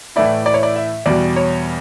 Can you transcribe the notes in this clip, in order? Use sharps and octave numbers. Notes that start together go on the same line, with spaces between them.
A2 E3 A3 E4 D5
D5
C#5
D5
E5
E2 B2 G3 D5
C#5